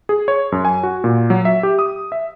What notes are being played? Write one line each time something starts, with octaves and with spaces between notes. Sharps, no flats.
G#4
C#5
F#2
G#5
F#4
A#2
F#3
E5
G4
D#6
E5